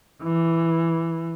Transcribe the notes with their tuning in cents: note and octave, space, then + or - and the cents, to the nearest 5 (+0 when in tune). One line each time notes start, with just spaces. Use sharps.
E3 +5